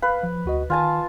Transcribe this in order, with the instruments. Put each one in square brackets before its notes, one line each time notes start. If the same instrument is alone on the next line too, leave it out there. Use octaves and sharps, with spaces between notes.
[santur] B4 [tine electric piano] F5
[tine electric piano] F3
D2 F#4 D#5
[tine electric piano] D#3 [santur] F4 G#5 A5